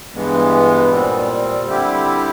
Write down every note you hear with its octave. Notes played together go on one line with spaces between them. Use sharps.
G2 E3 G#3 B3
A#2 G3 C4
D3 G3 C4 E4 G4